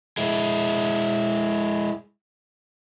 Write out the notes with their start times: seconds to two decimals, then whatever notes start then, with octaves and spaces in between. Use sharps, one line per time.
0.17 G#3 E4